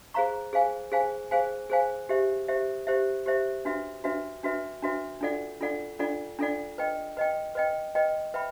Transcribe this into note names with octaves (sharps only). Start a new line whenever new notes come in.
G#4 C5 F5 A#5 C#6
G#4 C5 F5 G#5
G#4 C5 F5 G#5
G#4 C5 F5 G#5
G#4 C5 F5 G#5
G4 C5 E5
G4 C5 E5
G4 C5 E5
G4 C5 E5
D4 F#4 B4 E5
D4 F#4 B4 E5
D4 F#4 B4 E5
D4 F#4 B4 E5
D4 F4 A4 D5 F#5
D4 F4 A4 D5 F#5
D4 F4 A4 D5 F#5
D4 F4 A4 D5 F#5
B4 D#5 G5
B4 D#5 G5
B4 D#5 G5
B4 D#5 G5
B4 E5 G5 B5